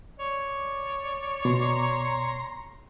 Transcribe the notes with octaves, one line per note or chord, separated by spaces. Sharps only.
C#5 D5
B2 A#5 C6